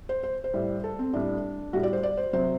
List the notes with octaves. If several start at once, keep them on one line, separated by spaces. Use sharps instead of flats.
C5
C5
C5
A2 G3
A4
C4
A2 G3 D4
A2 G3 F#4
D5
C5
D5
C5
C3 F#3 C5